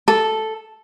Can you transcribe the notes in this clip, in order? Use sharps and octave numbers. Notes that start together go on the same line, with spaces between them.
A4